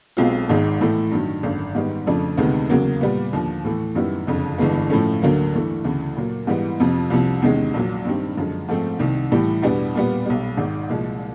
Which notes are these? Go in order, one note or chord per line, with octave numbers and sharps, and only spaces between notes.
B1 B2 G#3 C4 F4
G#1 G#2 D#3 G#3
A2 E3 A3
G2 D#3 F#3
G#1 F#2 D3
G#2 D#3 G3 B3
F2 C#3 F3 A3 D4
D2 C3 D#3 G#3 B3
E2 C#3 F#3 A#3
A#2 G3 B3
D#2 D3 F3
A2 E3 A3
F#2 D#3 G3 B3 E4
F#1 F2 D3
G1 G2 E3 G#3 B3
A2 F3 A3 C#4
D2 D3 F#3 A#3
G2 E3 A3
D2 C#3 E3
A#2 F#3 A#3
G#2 E3 G3 B3
F2 C3 F3
C2 C3 F3
E2 C3 D#3 G#3 C#4
A#1 A#2 F#3
G2 D#3 G3 C4
F#2 D3 F3 G#3
G#2 F3 A3 C4
C2 C3 D#3
A2 E3 G3
E2 B2 G3 B3 D4
A#2 G3 B3
B1 B2 G3
G#1 G#2 D#3
C2 A#2 F3 G#3